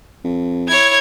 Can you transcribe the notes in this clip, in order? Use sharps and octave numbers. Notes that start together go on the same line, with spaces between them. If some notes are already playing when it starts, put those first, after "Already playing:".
F2
E4 C#5 G#6